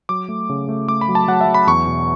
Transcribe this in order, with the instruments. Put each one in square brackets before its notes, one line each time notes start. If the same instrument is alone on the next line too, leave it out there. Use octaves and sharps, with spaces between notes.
[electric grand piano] F#3 D6
A3
C#3
A3
A3 D6
B5
F#3
A5
F#3 F#5
E5
F#3
B5
E2 C#6
B2